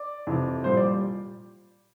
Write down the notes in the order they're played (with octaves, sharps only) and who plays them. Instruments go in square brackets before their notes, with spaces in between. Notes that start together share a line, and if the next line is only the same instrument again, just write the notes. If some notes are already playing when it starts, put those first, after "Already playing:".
Already playing: [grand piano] D5
F2 C3 E3
A#2 G3 C5
D5